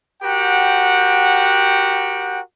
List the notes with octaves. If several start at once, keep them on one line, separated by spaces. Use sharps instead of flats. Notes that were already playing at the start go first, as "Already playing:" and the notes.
F#4 G4 A#4 F#5 G5